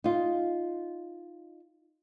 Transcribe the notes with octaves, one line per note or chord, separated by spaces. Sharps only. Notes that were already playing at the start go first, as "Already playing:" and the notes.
D#4 F4